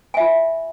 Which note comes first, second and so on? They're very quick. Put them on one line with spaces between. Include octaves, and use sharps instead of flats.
G#5 E5 F4